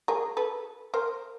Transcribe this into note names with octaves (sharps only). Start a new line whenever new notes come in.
G#4 A#4
A4 B4
A#4 C5